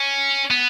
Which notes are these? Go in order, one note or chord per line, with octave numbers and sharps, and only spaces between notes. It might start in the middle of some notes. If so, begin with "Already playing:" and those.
Already playing: C#4
B3